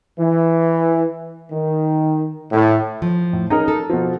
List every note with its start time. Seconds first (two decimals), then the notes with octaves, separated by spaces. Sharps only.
0.19 E3
1.52 D#3
2.52 A2
3.02 F3
3.33 A2
3.50 C#4 D#4 G#4 A#4
3.68 A4
3.90 B2 F3